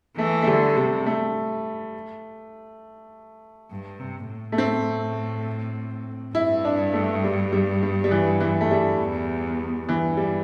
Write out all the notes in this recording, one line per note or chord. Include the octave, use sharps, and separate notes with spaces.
E3 A3
A3
D3 G3
C3 G3
A3
G2
C3
A2
A3
C4
G2 E4
D4
A3
G3
G3
G3
G3
E3
E3
A3
G3
E2
G2 E3
G3